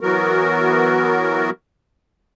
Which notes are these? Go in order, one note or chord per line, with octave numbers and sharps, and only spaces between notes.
E3 F#3 B3 F#4 A#4